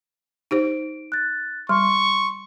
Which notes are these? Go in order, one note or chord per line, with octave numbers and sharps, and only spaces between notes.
D#4 G4 C5 D7
F#6 A6
G3 C6 C#6